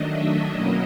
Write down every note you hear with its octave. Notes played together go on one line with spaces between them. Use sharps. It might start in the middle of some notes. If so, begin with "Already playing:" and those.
Already playing: D#3 F#3 A3 D4 D#5
E5
B2 F#3 A#3 C#4 E4 D#5